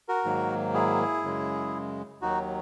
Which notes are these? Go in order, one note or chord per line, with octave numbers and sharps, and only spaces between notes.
F#4 A#4
G#2 D#3 F#3 A#3
E4 G#4
F#2 C#3 G#3
D#2 D#3 F#3 D#4 F#4